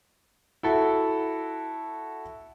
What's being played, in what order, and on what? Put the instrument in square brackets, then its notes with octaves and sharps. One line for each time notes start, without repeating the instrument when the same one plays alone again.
[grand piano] E4 F#4 A4